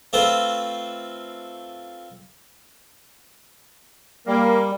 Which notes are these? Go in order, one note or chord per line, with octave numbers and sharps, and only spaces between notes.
A3 C4 F4 A4 B4 C5
G3 A#3